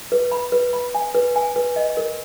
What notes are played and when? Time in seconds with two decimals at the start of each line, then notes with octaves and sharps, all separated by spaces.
0.12 B4
0.32 B5
0.52 B4
0.73 B5
0.95 G#5
1.15 B4
1.36 G#5
1.56 B4
1.76 D#5
1.97 A#4